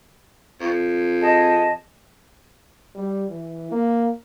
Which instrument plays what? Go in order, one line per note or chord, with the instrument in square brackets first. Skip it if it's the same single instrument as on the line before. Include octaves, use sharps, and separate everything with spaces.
[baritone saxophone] F2
[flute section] G#4 D#5 A5
[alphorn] G3
E3
A#3